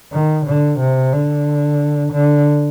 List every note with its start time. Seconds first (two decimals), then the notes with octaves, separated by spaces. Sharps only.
0.13 D#3
0.46 D3
0.80 C3
1.13 D3
2.13 D3